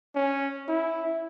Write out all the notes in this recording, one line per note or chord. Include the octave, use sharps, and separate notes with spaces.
C#4
E4